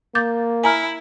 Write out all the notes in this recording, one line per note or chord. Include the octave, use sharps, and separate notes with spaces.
A#3 D6 G6 A6
E4 G#5 A#5 F6